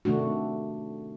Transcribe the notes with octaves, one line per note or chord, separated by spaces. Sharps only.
C3 D#3 A3 D4 F#4